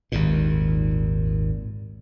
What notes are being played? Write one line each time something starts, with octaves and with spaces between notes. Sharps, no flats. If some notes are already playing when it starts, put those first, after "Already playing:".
G#1 D#2 A#2